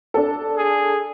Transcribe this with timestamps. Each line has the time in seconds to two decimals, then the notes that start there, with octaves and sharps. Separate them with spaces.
0.14 D4 A4
0.57 G#4